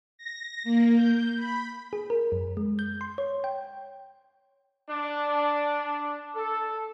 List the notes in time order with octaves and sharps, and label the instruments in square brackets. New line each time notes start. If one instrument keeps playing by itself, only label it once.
[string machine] A#6
A#3
G6
B5
[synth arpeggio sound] G#4
A#4
F#2
G#3
G6
C6
C#5
G5
[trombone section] D4
A4